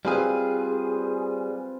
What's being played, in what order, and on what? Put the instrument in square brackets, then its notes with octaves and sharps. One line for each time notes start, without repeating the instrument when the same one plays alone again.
[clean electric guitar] G3 G#4 [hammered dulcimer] C4 F4 B4